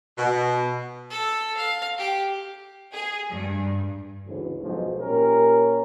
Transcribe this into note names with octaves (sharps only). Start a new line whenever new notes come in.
B2
A4
F5
G4
G#4
G2
D2 G#2 C#3 E3
B1 G#2 F3 F#3 G#3
A#2 C#4 G4 A#4